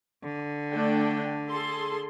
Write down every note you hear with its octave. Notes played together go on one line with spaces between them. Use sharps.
D3
A3 D4 G5
G#4 A4 C6